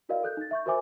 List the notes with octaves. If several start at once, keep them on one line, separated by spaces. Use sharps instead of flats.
E4 F#4 A#4 D5 D#5 F5
A4 F#6 G6
D#4 A6
E5 C#6 G6
F#4 A#4 C5 E5 G#5 D6